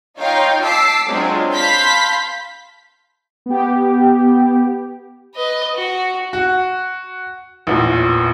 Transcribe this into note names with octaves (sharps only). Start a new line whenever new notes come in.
D#4 F4 C#5 F5 G5
A5 D6 E6 B6 C7
F#3 G#3 C4 D4 F4
F5 A5 B5 C6 G6 B6
B3 G4
B4 D#5
F#4
F#4
A1 E2 A#2